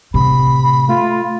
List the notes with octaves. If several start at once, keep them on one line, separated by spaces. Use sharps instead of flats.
A2 C3 B5
A3 F4